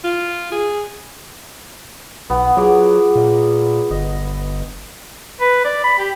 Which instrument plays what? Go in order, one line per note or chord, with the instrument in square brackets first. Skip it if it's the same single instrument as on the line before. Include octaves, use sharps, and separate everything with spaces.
[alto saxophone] F4
G#4
[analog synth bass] B1 [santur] B3 F#5
[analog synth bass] F#3 [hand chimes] F4 G#4 D6
[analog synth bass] A#2
[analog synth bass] G1 [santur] D#5
[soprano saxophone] B4
D5
B5
G4